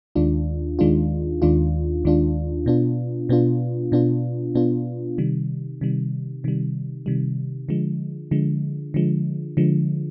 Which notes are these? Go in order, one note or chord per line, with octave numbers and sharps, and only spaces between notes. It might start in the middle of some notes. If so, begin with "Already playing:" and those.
D#2 D#3 G#3 D4 F4
D#2 D#3 G#3 D4 F4
D#2 D#3 G#3 D4 F4
D#2 D#3 G#3 D4 F4
B2 B3 D4 F4
B2 B3 D4 F4
B2 B3 D4 F4
B2 B3 D4 F4
C3 D#3 G3
C3 D#3 G3
C3 D#3 G3
C3 D#3 G3
D3 F3 G#3
D3 F3 G#3
D3 F3 G#3
D3 F3 G#3